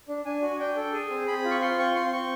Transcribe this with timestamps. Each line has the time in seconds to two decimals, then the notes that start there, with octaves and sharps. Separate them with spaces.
0.08 D4
0.25 D4 G#5
0.42 F#4
0.59 D4 G5
0.77 A4
0.93 G#4 G#5
1.10 C4
1.27 C4 B5
1.45 F4
1.51 C#6
1.61 F4 C6
1.78 C4 C#6
1.95 C4 C6
2.13 C4 C#6